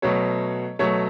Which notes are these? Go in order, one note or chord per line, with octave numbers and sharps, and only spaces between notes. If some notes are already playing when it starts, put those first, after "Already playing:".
B2 F#3 A3 C#5
B2 F#3 A3 C#5